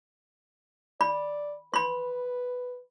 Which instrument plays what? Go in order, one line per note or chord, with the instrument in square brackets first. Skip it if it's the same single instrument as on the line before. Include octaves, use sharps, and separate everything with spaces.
[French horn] D5 [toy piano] B5
[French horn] B4 [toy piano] B5 C6